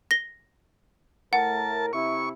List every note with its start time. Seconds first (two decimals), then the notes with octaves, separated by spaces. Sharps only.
0.11 A#6 G7
1.33 A2 A3 A#4 F#5 A5
1.93 C3 E4 C#6